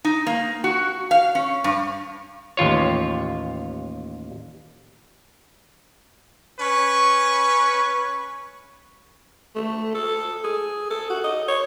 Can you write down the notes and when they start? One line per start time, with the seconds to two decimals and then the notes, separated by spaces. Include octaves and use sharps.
0.05 D#4
0.27 A#3
0.64 F#4
1.11 F5
1.35 C#4
1.64 G2
2.57 A1 D#2 F4 C#5
6.60 C#4 B4 C#6
9.55 A3
9.94 A4
10.44 G#4
10.90 A4
11.10 F#4
11.24 D#5
11.48 C#5